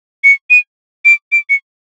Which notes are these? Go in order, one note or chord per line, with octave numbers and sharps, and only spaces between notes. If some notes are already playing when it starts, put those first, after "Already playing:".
C#7
D#7
D7
D7
C#7